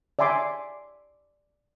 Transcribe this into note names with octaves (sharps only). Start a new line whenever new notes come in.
D5 E5 G#5 C6 D6